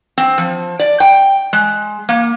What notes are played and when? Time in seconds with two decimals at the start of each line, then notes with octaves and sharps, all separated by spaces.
0.18 C4
0.38 F3
0.79 D5
1.00 G5
1.53 G#3
2.09 A#3